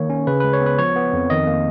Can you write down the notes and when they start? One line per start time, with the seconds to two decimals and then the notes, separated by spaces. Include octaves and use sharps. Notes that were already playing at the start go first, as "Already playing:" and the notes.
Already playing: D#3 A#3 C#5
0.10 C#4
0.27 C#3 B4
0.40 G#3 B4
0.53 C#5
0.61 B3
0.66 B4
0.78 F3 C#5
0.96 B3
1.13 F2
1.30 D#3 D#5
1.47 A#3